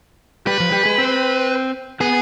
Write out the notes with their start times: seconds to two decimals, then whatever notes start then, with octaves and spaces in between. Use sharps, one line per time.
0.47 G3 G4 B4
0.60 F3 F4
0.72 G3 G4
0.85 G#3 G#4
0.98 C4 C5
2.00 B3 G#4 B4